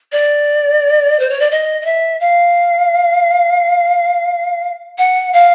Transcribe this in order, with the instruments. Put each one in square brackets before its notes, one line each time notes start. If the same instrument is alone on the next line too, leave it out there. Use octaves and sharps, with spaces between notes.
[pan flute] D5
C5
C#5
D5
D#5
D#5
E5
F5
F#5
F5